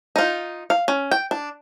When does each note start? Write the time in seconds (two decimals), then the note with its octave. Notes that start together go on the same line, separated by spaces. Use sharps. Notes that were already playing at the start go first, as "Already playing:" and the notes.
0.16 D#4 F4
0.70 F5
0.88 C#4
1.11 G5
1.31 D4